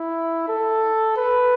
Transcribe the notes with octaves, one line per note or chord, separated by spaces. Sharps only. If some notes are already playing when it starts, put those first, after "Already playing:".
Already playing: E4
A4
B4